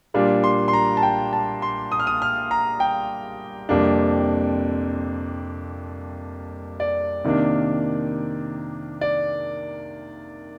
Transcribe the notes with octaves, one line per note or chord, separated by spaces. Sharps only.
A#2 G3 A#3 D4 F4
C6
C6
A#5
A5
G5
A5
C6
D#6
F6
D#6
F6
A#5
G5
F2 C3 G3 A#3 D4
D5
C3 D#3 A#3 D4
D5